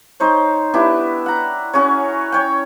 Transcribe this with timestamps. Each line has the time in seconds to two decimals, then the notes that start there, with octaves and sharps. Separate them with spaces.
0.20 D#4 C5 C#5
0.74 B3 D4 E4 G4
1.26 F#5 A#5
1.73 C#4 F#4 G#4 C#5
2.32 C#5 G5